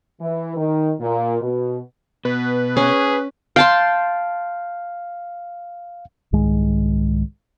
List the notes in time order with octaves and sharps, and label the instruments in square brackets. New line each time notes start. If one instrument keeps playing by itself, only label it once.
[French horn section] E3
D#3
A#2
B2
[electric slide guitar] B2 [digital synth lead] B4
[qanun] C#4 [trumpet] G#4
[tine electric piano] F5 [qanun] G5 A5 C6
[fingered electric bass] C2 G#2 D#3 G#3